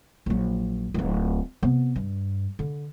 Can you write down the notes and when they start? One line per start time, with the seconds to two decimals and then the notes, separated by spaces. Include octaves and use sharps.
0.26 A#1 F#3
0.94 D1 F4
1.62 C3 B3
1.96 G2
2.59 D3